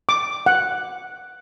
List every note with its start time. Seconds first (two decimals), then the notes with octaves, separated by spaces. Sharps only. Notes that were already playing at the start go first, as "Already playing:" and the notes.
0.09 D6
0.46 F#5